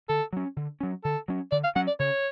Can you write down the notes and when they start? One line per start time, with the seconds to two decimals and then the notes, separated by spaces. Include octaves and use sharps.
0.09 D3 A4
0.33 F#3 C#4
0.56 D3
0.80 F#3 C#4
1.04 D3 A4
1.28 F#3 C#4
1.52 D3 D5
1.64 F5
1.75 F#3 C#4 F#5
1.87 D5
1.99 C#3 C#5